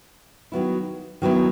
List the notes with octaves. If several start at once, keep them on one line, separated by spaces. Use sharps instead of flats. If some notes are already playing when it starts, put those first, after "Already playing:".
D#3 F#3 B3 E4
D#3 F#3 B3 E4